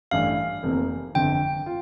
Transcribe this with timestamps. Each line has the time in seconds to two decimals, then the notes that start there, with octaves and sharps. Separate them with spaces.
0.11 A1 G2 E3 A3 F5
0.63 F1 F2 C3 E3 A#3
1.15 G1 F2 D3 G5
1.66 F4